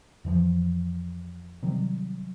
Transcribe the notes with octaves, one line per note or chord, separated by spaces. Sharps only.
F2 E3 F3
C3 D#3 F#3 G3